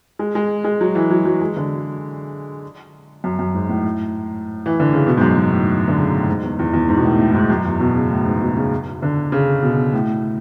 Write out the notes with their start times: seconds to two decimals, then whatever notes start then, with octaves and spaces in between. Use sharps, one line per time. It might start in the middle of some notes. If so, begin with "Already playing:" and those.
0.19 G#3
0.35 G#3
0.64 G#3
0.81 F#3
0.95 E3
1.10 F#3
1.25 F#3
1.41 G#3
1.57 D3
3.24 F#2
3.39 F#2
3.54 G#2
3.69 A2
4.66 E3
4.80 D3
4.93 C#3
5.07 B2
5.17 G#2
5.21 F#2
5.36 G#2
5.52 A2
5.88 D3
5.98 C#3
6.07 B2
6.18 A2
6.28 G#2
6.43 E2
6.59 E2
6.73 E2
6.88 G#2
6.97 B2
7.04 A2
7.19 A2
7.30 A2
7.34 G#2
7.50 F#2
7.65 E2
7.80 B2
7.95 C#3
8.11 A2
8.26 G#2
8.42 B2
8.56 C#3
9.02 D3
9.32 C#3
9.63 B2
9.93 A2